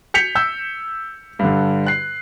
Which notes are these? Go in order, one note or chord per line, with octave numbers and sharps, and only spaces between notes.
G6 B6 C#7 F7
E6 G6
G2 D3
F#6 C7